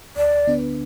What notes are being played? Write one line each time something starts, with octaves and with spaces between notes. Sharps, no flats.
D2 D5
D3 B3 D4 B4